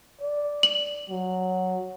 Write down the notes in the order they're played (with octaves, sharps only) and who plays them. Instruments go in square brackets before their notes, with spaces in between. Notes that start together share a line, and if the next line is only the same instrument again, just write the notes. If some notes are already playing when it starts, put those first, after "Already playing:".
[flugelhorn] D5
[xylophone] F#7
[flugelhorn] F#3